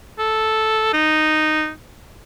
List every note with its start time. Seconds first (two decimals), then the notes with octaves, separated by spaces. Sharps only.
0.19 A4
0.93 D#4